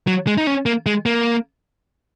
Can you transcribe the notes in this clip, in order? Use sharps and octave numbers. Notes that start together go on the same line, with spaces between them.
F#3
G#3
D#4
C#4
A#3
G#3
A#3